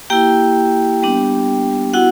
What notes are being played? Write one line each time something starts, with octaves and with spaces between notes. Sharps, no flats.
A#3 E4 G4 G5
G3 B3 D4
B3 E4 F#4 F#5